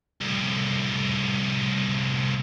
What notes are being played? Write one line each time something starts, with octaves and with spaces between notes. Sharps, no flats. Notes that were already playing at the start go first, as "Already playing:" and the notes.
C2 A2